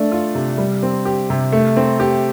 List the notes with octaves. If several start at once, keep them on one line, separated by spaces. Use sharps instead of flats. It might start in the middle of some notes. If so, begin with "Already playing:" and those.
Already playing: A3 D4
F4
C3
G3
C4
G4
C3
A3
C4
G4